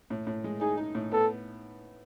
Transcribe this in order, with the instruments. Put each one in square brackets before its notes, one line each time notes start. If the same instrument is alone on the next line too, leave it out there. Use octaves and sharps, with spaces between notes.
[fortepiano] A2
A2
G#3
[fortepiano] D#4 [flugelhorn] G#4
[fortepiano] D#4
A2
[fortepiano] B3 [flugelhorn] A4